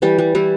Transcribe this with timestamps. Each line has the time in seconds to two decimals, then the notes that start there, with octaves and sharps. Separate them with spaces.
0.02 E3 G3 G4
0.18 G3
0.35 E3 G3 E4